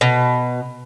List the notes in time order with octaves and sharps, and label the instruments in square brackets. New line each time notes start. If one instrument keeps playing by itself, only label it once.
[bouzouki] B2